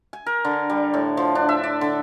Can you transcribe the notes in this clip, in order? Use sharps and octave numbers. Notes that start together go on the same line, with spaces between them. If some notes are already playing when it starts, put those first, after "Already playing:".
G#5
A#4
D3
G3
A2
F3
D4
E5
D5
D3